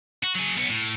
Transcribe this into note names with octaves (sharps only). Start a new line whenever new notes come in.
F#4
F#3 G#4
B1 B3
A2